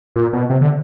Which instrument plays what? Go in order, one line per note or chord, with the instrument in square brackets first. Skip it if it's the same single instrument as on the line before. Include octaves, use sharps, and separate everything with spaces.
[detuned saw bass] A#2
B2
C3
D3